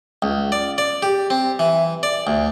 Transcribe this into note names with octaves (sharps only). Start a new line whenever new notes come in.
C#2
D5
D5
G4
C4
E3
D5
D2